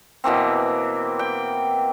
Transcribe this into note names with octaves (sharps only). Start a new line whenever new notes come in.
B2 E3 A#3 C4
G5